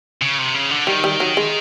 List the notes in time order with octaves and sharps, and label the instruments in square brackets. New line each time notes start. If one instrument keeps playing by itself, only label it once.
[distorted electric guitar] C#3
C3
C#3
D3
[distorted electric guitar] D#3 [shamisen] G3
[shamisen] G3
F#3
G#3